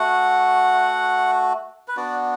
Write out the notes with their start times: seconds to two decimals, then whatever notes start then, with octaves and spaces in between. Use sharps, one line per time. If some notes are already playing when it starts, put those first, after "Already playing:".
Already playing: A3 F#4 F#5
1.88 B4
1.97 B3 D4 F#4 D5